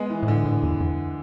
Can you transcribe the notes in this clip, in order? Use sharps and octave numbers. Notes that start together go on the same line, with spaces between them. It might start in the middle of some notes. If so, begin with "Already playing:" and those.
Already playing: G#3 B3
E3
A2
D3
A2 E3
E2
F2